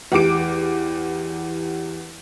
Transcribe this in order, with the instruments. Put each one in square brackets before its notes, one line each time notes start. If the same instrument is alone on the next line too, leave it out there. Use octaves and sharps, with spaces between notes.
[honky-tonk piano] E2 G4 D6 D7